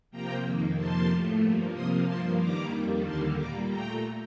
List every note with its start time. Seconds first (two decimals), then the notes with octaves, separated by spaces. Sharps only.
0.11 C3 F3 A#3 G5 A#5
0.44 F2 D#3 A#3
0.76 F2 C3 F3 A#3 A5 C6
1.09 A2 F3 A3
1.41 G2 F3 A#3
1.73 C3 F3 A#3 C6 D#6
2.06 G2 F3 A#3 A5 C6
2.39 G2 D#3 G3 A#3 A#5 D6
2.72 F2 D#3 G3 A#3
3.05 D#2 D3 G3 A#3 A5 C6
3.36 A#2 G3 A#3 A#5 D6
3.69 A#2 A3 G5 A#5